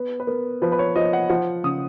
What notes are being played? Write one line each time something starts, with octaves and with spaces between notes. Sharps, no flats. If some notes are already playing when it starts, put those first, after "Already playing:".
Already playing: B3 B4
B4
B3 A#4
F3 B4
B4
C#5
F3 D#5
F#5
F3 F#5
C#3 D#6